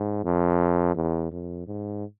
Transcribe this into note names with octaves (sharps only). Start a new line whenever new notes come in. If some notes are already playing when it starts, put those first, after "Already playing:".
Already playing: G#2
F2
E2
F2
G#2